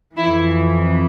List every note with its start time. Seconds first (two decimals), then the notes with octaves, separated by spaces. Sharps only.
0.17 F2 E3 E4